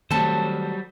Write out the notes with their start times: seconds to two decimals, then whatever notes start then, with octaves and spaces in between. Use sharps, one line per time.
0.11 D#3 F#3 G3 A3 C4 A4 C5 A5